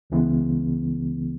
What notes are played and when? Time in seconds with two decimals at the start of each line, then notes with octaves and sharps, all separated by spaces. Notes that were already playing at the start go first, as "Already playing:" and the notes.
0.10 C#2 C#3 E3 G#3 B3